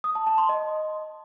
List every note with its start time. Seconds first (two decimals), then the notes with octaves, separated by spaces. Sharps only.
0.04 D#6
0.15 A5
0.27 A5
0.38 C6
0.49 D#5